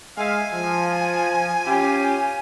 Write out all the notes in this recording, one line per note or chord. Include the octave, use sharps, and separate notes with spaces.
G#3 E5 F5 G#5
F3
C#4 F4 G4